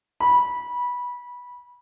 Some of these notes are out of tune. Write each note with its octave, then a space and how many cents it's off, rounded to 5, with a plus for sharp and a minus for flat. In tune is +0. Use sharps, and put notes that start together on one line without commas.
B5 -20